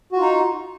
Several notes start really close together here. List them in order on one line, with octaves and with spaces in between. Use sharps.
F#4 F4 D#4